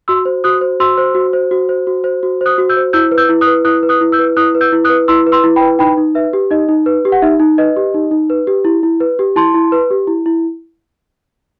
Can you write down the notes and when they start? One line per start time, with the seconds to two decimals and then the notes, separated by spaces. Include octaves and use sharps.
0.08 F#4 C6 E6
0.25 C5
0.44 F#4 D#6 F#6
0.61 C5
0.80 F#4 C6 E6
0.98 C5
1.15 F#4
1.33 C5
1.51 F#4
1.69 C5
1.87 F#4
2.04 C5
2.23 F#4
2.41 C5 D#6 F#6
2.58 F#4
2.69 E6 G6
2.77 C5
2.93 E4 E6 G6
3.11 B4
3.18 E6 G6
3.29 E4
3.41 D#6 F#6
3.47 B4
3.65 E4 D#6 F#6
3.83 B4
3.89 D#6 F#6
4.01 E4
4.12 E6 G6
4.19 B4
4.37 E4 D#6 F#6
4.55 B4
4.61 E6 G6
4.73 E4
4.84 D#6 F#6
4.90 B4
5.08 E4 C6 E6
5.27 B4
5.32 C6 E6
5.44 E4
5.56 G5 B5
5.61 B4
5.79 D#4 G5 B5
5.97 D#4
6.15 B4 E5
6.33 G4
6.51 D#4 D#5
6.69 D#4
6.86 B4
7.05 G4
7.12 F#5
7.22 D#4 E5
7.40 D#4
7.58 B4 D#5
7.76 G4
7.94 D#4
8.11 D#4
8.30 B4
8.47 G4
8.65 E4
8.83 E4
9.00 B4
9.19 G4
9.36 E4 A5 C6
9.54 E4
9.72 B4
9.91 G4
10.07 E4
10.26 E4